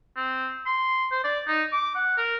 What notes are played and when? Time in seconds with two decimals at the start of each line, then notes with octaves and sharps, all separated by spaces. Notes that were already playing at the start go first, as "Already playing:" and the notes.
0.16 C4
0.66 C6
1.12 C5
1.24 D5
1.47 D#4
1.72 D6
1.95 F#5
2.17 A#4